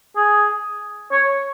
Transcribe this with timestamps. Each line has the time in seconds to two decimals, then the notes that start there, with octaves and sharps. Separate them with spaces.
0.16 G#4
1.12 C#5